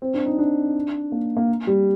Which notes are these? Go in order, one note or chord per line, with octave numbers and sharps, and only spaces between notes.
C4
D4
D#4
D4
A#3
A#3
G3